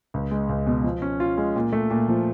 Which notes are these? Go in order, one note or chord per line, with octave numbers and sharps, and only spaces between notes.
C#2
G#3
C#2
B2
F3
C#4
F4
G#3
A#2
A3
A#2
F3